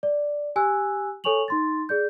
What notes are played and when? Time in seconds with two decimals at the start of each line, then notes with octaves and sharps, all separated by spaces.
0.03 D5
0.56 G4 G#5 E6 F#6
1.24 A4 C#5 G#5 C#6 F7 F#7
1.48 D#4 C6 A6
1.89 G#4 D5 G6